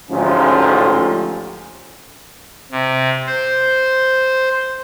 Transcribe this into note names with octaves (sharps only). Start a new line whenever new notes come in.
A1 D2 G#2 F3 C#4 G4
C3
C5